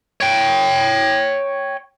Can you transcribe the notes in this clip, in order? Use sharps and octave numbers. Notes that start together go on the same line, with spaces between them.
C#5 G5